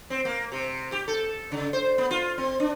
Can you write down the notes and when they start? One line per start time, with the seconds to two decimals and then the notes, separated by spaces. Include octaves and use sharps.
0.10 C4
0.25 A#3
0.52 C3
0.92 G4
1.08 A4
1.52 C#3
1.73 C5
1.98 B3
2.11 F4
2.38 C4
2.60 D4